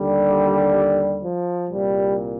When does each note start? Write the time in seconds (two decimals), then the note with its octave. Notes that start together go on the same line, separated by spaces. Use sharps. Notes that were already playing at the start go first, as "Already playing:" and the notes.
Already playing: D#2 D3 G3
1.22 F3
1.68 C2 A#2 G3